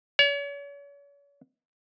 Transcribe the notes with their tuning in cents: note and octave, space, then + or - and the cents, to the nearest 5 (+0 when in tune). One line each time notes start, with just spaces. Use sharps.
C#5 +40